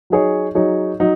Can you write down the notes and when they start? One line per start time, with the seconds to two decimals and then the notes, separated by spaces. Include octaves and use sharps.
0.10 F#3 D#4 G#4 C#5
0.55 F#3 D#4 G#4 C#5
1.00 F#3 D#4